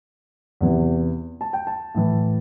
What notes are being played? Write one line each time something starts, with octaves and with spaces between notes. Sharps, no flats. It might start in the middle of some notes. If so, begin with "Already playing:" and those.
E2 C3 E3
A5
G5
A5
A2 E3